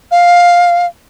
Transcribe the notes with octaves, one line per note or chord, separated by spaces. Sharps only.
F5